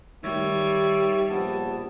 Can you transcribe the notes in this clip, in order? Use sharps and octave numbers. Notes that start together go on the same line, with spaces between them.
D#3 G3 C#5 E5
A#1 B3 A5